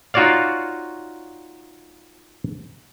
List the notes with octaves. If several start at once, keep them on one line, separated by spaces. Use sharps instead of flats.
D#4 F4 F#4 C#5 D5 F5